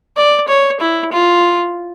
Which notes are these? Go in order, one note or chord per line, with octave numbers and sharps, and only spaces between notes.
D5
C#5
E4
F4